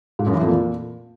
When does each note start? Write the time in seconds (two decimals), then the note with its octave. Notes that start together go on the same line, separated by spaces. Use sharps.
0.19 G#2
0.26 F#2
0.34 E3
0.41 F2
0.48 A#2